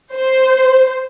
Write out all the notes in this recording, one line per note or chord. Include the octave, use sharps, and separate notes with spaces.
C5